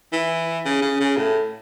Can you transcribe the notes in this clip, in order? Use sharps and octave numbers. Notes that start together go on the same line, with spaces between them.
E3
C#3
C#3
C#3
A2